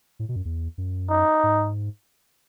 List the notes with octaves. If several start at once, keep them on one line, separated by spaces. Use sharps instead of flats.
A2
B2
F#2
E2
F#2
D#4
G#2